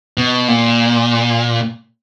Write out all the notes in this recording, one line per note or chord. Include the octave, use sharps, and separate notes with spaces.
B2
A#2